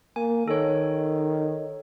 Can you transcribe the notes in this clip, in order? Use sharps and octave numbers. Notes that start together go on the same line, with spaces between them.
A#3 G#5
D#3 A4 C#5